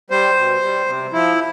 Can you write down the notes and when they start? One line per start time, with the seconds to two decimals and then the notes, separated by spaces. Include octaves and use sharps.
0.10 G3 C5
0.36 B2
0.62 G3
0.86 C3
1.12 F3 E4